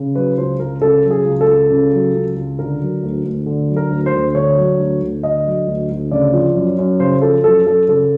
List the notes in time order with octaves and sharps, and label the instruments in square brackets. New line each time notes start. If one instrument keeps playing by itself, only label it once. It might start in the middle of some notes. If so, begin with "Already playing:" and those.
Already playing: [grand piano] C#3
F#3 B4
C#2 C5
C#2 A#4
C#3 A4
F#3
G#4
C#2
A4
C#2
C#3
F#3
C#2
C#2
D3 A#4
F#3
D2
D2
D3
F#3
A#4
D2
C5
D2
D3 C#5
F#3
D2
D2
D3 D#5
F#3
D2
D2
C#3 D5
F3
F#2
F#2
C#3 C5
F3 A4
F#2 A4
F#2 A4
C#3 A4